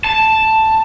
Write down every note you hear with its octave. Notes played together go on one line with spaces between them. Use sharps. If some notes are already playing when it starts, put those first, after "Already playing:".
A5